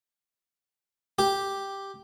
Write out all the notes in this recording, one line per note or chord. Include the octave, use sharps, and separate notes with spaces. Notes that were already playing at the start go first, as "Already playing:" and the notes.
G4